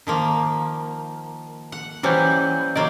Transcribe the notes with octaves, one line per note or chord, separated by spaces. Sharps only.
D#3 F3 A#3
F#5
E3 F#3 G3 C#4 C5 G6
F#3 A#3 D5 D#5 G6